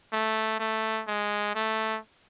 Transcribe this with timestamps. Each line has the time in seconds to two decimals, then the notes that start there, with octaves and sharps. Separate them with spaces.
0.13 A3
0.60 A3
1.08 G#3
1.55 A3